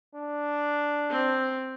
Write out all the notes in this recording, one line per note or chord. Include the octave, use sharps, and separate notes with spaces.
D4
C4